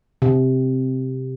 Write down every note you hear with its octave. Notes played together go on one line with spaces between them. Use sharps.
C3